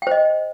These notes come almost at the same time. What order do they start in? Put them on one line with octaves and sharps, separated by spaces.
G5 C5 D#5